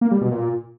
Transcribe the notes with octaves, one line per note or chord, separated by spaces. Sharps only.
A#3
G3
B2
A#2